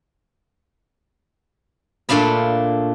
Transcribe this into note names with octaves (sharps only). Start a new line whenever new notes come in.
A#2 A3 D4 F5 B5